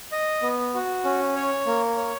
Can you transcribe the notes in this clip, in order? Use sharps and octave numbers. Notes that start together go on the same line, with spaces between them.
D#5
B3
F#4
C#4
C#5
A#3
C#5